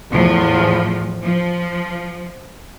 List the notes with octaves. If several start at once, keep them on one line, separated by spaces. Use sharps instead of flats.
E2 A2 F3
F3